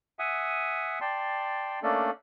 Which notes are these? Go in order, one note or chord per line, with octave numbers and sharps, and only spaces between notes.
E5 F#5 G#5 D#6
D5 G5 A5 C6
A3 A#3 C#4 D4 A4 D5